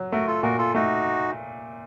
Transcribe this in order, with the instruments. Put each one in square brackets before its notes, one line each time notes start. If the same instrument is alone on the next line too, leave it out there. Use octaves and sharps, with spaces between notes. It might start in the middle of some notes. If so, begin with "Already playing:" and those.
Already playing: [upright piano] F#3
[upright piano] A3 [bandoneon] F#4 A#4
[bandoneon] F4 A4
[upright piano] A#2 [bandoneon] F#4 A#4
[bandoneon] F4 A4
[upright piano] A3 [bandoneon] D#4 F#4